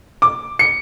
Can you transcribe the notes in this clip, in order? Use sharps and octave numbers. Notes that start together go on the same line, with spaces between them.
D6
C#7